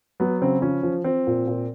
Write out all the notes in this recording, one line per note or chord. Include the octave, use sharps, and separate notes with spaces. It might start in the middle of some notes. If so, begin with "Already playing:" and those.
F#3 B3
C#3 C4
F3 C#4
F3
F3 C4
A#2
A#2